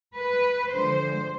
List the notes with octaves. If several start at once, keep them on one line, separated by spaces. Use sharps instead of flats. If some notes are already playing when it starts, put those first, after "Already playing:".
B4
D3 F3 G#3 C5